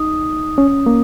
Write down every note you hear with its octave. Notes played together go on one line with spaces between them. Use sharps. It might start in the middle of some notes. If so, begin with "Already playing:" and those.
Already playing: D#4 D#6
C#4
A#3